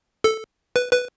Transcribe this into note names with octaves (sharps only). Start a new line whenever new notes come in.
A4
B4
B4